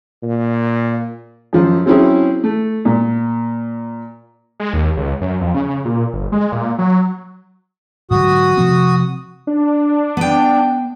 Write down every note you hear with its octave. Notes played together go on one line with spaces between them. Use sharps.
A#2
F#2 F3
F#3 C4 C#4 E4 G#4
A3
A#2
G#3
D#2
C#2
F#2
F2
C#3
A#2
G1
G#3
A#2
F#3
G#2 D3 F#3 F#4 D#6
C3 F3 C4
D4
B3 G5